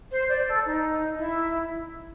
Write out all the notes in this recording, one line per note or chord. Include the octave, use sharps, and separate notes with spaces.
C5
D5
A4
D#4
E4